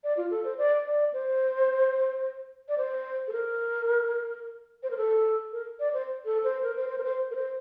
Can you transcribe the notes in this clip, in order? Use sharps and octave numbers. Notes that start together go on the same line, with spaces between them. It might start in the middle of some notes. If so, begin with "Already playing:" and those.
D5
F4
A4
C5
D5
D5
C5
D5
C5
A4
A#4
C5
A#4
A4
A#4
D5
C5
A4
C5
A#4
C5
C5
A#4
C5
A#4
C5